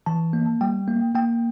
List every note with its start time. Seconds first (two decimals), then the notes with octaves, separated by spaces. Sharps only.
0.06 E3 A5
0.33 A#3
0.61 G3 G5
0.88 A#3
1.15 A#3 G5